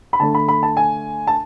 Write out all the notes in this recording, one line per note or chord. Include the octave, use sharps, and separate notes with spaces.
B5
D3 A3 A5
B5
B5
A5
G#5
A5